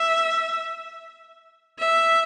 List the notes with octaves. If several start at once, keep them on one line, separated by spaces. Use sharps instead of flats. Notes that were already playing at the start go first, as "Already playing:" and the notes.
Already playing: E5
E5